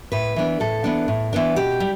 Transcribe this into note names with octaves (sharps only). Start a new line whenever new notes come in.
A2 B4
E3 B3 D4
A2 A4
E3 B3 D4
A2
E3 B3 D4
B2 G4
G3